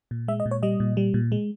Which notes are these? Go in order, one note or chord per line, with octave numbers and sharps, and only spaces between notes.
A#2
G#3 E5
D#5
A#2
C#5
G3 D#5
A#2
G3
A#2
G#3